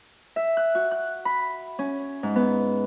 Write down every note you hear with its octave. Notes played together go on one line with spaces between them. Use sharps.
E5
F#6
F#4
F#6
B5
C#4
G#2
B3